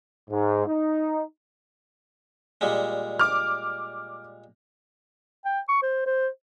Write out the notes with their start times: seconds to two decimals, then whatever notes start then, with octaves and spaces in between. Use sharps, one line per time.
0.30 G#2
0.66 D#4
2.61 A#2 G3 G#3
3.19 D6 F6
5.45 G5
5.69 C#6
5.83 C5
6.06 C5